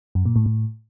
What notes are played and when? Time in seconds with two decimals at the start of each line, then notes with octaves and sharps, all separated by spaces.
0.15 F#2
0.25 A#2
0.36 A2
0.46 A2